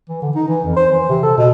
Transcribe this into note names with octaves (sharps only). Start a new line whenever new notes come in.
E3
D3
D#4
E3
F2
C5
E3
C3
A4
B2